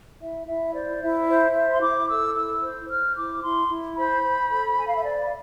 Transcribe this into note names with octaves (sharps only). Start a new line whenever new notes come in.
E4 E5
E4 E5
C5 D5
E4 E5
C5
C5
C6
E4 D6
A4 E6
E4 E6
C5
C5 F6
E4 D6
E4 C6
E4
C5 B5
C5
A4
A4 G#5
F5
E5
C5 D5
F5